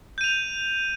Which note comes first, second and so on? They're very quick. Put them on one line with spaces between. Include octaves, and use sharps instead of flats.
G6 D#7 F7